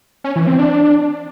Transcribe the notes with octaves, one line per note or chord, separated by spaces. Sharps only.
C#4
E3
C4
D4